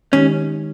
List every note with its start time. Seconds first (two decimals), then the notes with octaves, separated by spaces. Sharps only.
0.12 D#3 G#3 C#4 D#4 G4